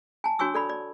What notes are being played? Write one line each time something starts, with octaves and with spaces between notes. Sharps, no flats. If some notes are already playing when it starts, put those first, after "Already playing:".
G#5 A5
D4 F#4 C#5 G#5 C#6 E6
A4 D5 B5
D5